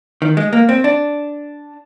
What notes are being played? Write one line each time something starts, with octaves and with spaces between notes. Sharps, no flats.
D#3
G#3
A#3
C4
D4